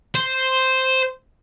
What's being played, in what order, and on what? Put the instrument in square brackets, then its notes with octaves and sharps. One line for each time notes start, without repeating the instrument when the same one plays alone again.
[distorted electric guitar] C5